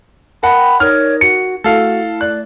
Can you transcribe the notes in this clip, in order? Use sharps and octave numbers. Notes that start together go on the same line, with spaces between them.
A#4 F#5 G5 A5 B5
D#4 A#4 C#5 D5 F6
F#4 C#7
A3 E4 F#4 A4 F5
D5 F#6